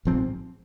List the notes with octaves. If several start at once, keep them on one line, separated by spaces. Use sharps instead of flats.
A#1 G#2 F3 C4